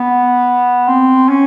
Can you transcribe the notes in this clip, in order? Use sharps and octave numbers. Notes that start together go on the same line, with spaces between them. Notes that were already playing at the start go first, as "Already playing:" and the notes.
Already playing: B3
C4
C#4